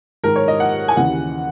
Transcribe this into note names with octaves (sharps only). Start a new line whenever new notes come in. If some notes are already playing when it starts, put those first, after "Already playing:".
G#2 D#3 A#4
C#5
D#5
F#5
G#5
D#2 C#3 E3 F#5